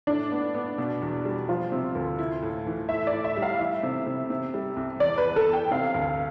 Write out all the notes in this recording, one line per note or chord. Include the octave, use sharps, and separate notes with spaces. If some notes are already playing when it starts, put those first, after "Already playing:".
A2 D4
B3
B3
B2
E2
G3
F3 F4
C3
D2
E4
A2
E3
A2 E5
D5
A2
E5
G3
F5
E3 E5
C3
C3
C3
G3
C2
E2 D5
B4
E2
A4
E2
G5
C3 F5
D2